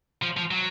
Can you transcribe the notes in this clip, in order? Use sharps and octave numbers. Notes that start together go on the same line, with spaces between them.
F3
F3
F#3